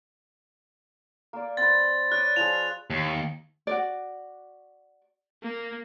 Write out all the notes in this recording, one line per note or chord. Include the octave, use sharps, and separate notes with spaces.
A#3 D5
C4 B4 A6
C#5 D5 F#6
F3 F4 G#4 F7
D#2
F#4 D5
A#3